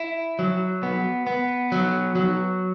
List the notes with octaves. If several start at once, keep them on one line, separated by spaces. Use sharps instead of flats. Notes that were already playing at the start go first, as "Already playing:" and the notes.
Already playing: E4
F#3
B3
B3
F#3
F#3